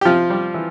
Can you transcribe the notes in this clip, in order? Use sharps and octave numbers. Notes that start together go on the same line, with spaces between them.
G4
C3 F3 F4
G3
E3